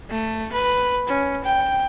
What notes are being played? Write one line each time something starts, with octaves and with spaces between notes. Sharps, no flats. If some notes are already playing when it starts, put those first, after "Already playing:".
A3
B4
C#4
G5